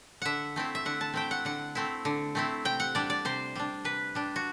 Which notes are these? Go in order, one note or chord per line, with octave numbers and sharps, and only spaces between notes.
D3 E5 F#5
A3 C4 E4
E5
D3 F#5
A5
A3 C4 E4 G5
F#5
D3 F#5
A3 C4 E4
D3
A3 C4 E4
C3 G5
F#5
G3 D4 D5
D5
C3 C5
G3 D4
C3 B4
G3 D4
F#4